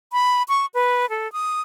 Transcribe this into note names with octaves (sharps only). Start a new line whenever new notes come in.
B5
C#6
B4
A4
D#6